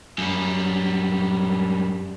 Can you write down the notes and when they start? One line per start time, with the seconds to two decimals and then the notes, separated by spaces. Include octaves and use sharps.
0.18 F#2 G3